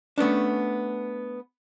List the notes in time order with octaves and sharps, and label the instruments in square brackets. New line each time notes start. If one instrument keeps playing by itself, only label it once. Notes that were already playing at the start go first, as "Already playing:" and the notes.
[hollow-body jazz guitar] A3 B3 C#4 D4